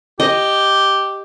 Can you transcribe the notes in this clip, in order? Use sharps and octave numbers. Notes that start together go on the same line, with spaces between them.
G4 D#5